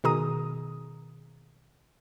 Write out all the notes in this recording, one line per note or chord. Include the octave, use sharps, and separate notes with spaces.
B2 D#3 G#4 A#5 D#6